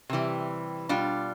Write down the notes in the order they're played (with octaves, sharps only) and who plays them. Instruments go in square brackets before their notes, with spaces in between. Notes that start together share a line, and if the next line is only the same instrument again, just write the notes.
[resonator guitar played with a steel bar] C3 E3 G3
B2 G3 D4 F4